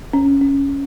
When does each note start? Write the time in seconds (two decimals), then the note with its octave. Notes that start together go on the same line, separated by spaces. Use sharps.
0.13 C#4
0.41 C#4
0.70 C#4